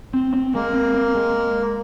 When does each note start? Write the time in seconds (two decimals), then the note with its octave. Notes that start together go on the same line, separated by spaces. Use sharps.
0.13 C4
0.34 C4
0.54 G#3 A#3
0.74 C4
0.95 C4
1.15 G#3